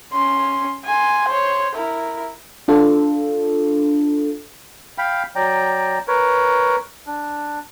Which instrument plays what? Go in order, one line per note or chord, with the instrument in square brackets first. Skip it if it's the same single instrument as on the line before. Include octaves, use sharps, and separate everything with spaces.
[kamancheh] C#4 C6
G#5 C6
C5 C#5
E4 A#4
[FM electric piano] D4 F4 A4
[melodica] F5 G5 B5
F#3 D5 G5 A#5
A#4 B4 C#5
D4